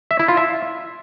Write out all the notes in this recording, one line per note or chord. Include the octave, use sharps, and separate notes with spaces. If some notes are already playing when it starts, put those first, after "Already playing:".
E5
E4
F4
E5